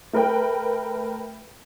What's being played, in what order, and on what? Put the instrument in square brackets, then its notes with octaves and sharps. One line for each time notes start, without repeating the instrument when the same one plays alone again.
[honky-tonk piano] A3 A#4 B4 G5